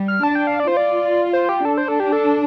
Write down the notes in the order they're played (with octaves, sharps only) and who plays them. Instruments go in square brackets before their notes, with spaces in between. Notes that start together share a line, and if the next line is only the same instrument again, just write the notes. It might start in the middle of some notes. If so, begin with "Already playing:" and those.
Already playing: [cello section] G3
[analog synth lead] F6
[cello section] D4 [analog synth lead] A5
[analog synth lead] G5
F5
D5
[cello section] F4 [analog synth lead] C5
[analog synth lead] D5
C5
G4
[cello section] D4 [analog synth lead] A4
[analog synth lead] C5
A4
G4
A4